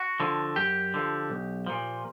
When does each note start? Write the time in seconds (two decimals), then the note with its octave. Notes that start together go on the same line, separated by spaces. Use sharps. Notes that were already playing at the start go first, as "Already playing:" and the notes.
Already playing: F#4
0.20 D3 F3
0.56 F#2 G4
0.94 D3 F3
1.30 B1
1.66 A#2 F3